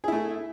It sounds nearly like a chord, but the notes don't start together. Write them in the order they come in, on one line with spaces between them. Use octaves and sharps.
G#4 E4 A3